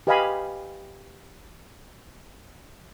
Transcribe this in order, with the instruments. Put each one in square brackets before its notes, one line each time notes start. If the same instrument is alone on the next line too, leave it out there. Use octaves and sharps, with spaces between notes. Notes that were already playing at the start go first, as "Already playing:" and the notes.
[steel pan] G4 B4 D#5 F5 G#5 B5